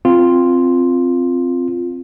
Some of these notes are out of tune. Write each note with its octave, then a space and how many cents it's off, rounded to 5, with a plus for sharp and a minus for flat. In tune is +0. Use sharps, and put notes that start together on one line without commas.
C4 +0 F4 +0